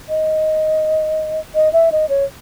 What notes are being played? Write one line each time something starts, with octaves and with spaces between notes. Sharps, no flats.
D#5
D#5
E5
D#5
C#5